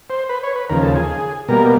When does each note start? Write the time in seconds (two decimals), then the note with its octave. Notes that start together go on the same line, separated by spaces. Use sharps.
0.10 C5
0.29 B4
0.43 C#5
0.56 B4
0.69 D#2 C#3 F3 A#4
0.82 A4
0.96 G#4
1.48 B2 G3 A#3 A#4